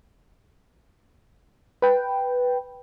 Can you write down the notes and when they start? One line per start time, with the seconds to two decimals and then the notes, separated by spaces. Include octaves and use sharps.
1.82 B4 G5